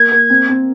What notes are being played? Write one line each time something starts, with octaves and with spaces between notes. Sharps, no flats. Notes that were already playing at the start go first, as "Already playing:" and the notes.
Already playing: A#3 G#6
A#3
C4
C4